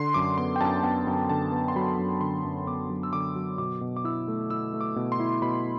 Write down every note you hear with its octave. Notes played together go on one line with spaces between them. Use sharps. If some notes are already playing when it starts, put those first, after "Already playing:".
Already playing: D3 C6
F#2 D6
B3 C6
G5
F#2 A5
B3 G5
F#2
D3 A5
B3
C6
F#3 B5
F#2
D3 C6
F#2
B3 D6
F#3
E6
D3 D6
F#3
B2 D6
B2
D6
E4 E6
A3
E4 E6
A3
D6
B2
C6
E4
B2 B5